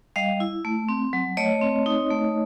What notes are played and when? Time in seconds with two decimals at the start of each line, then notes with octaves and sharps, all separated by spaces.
0.16 G3 D#5 F5
0.40 E4
0.65 A3
0.89 C4
1.13 F#3
1.37 A3 C#5 D#5
1.62 C4
1.86 D#4
2.10 A3